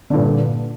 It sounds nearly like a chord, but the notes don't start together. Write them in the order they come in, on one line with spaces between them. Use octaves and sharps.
D3 G2 A#2